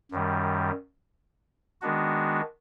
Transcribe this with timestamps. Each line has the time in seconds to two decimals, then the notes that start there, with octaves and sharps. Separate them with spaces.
0.11 F#2 D#3 G3
1.81 D#3 G#3 B3 D4 F#4